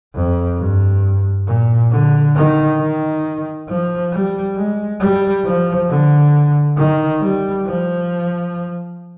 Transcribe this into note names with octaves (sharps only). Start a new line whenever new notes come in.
F2
G2
A#2
D3
D#3
D#3
F3
G3
G#3
G3
F3
D3
D#3
G3
F3